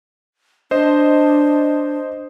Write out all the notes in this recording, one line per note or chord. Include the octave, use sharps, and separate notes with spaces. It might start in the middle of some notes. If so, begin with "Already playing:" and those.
D4 C5 D#5